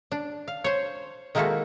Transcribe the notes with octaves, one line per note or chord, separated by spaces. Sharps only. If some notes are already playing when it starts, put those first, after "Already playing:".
D4
F5
C5 C#5
D#3 G#3 A#3 E4 F#4 A4